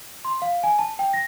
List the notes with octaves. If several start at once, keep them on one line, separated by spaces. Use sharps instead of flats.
C6
F5
G#5
A5
G5
A#6